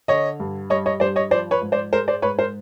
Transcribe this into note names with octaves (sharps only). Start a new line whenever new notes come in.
D3 C#5 D#5
G2
G3 C#5 D#5
C#5 D#5
G2 C5 D5
C#5 D#5
F3 C5 D5
B4 C#5
G#2
C5 D5
G#3 A#4 C5
C5 D5
G#2 B4 C#5
A#4 C5